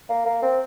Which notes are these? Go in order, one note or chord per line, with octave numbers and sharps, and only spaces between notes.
A#3
A#3
C4